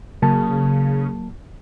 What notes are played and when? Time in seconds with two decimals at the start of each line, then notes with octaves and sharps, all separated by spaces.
0.22 C#3 F#3 A#3 A5